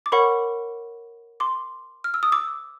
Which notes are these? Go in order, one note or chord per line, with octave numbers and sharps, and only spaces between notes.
D6
A#4 C#5 F#5 B5 C#6
C6 D6
F6
E6
D#6
D6 E6